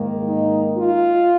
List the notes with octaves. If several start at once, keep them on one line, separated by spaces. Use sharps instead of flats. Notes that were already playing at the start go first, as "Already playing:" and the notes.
Already playing: G#2 D#3 A#3
D#4
F4